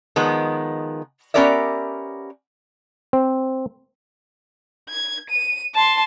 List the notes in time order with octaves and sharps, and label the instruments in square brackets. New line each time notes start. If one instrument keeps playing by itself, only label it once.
[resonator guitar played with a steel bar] D#3 F3 G#3 B3
B3 C#4 G4 A#4 D5 E5
[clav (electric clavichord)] C4
[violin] G#6
D#7
A5 C6